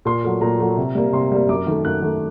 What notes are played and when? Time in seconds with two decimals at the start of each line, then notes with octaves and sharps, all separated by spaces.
0.05 A#2 C6
0.23 F#3 A3
0.41 A#2 A#5
0.60 F#3 A3
0.77 C3
0.95 G3 A#3
1.13 C3 C6
1.32 G3 A#3
1.49 F#2 D6
1.67 D#3 A3
1.85 F#2 F#6
2.02 D#3 A3